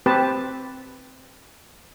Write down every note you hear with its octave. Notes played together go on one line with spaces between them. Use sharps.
C4 G4 B4 C5 A5